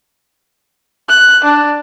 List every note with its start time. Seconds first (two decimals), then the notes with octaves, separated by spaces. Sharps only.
1.09 F#6
1.44 D4